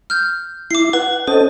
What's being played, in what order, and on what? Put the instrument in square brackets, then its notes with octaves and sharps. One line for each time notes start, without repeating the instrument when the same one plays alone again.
[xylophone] F6 G6
[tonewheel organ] E4 [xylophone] D6 C7
[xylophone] B4 [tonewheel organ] F#5
[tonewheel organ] C#4 A4 D#5 [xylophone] C5